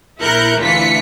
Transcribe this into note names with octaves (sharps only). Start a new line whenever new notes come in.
A#1 E4 A#4 F#6 G6 C#7
D2 E3 D4 F4 B6 C#7